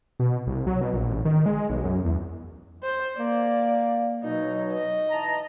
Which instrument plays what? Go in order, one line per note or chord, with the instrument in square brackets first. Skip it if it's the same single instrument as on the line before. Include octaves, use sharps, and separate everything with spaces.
[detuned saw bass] B2
C2
F#3
B2
A#1
A1
D#3
G#3
G#3
B1
F#2
E2
[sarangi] C5
[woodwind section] A#3 [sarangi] D5
[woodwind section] B2 F#3 [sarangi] D#4
[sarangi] D#5
[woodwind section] E3 A5 A#5